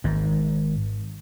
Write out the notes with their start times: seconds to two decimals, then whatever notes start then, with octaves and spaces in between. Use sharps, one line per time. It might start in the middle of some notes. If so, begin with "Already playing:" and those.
0.04 G#1 G#2